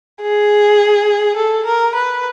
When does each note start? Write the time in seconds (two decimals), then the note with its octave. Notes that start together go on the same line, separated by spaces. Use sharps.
0.22 G#4
1.37 A4
1.65 A#4
1.95 B4